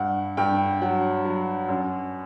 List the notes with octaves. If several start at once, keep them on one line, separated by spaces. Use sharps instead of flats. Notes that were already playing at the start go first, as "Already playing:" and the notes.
Already playing: G2 F#5
G2 G5
F#3 F#5
F#3
F#2